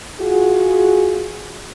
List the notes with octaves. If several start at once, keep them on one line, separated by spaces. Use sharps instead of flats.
F4 F#4 G#4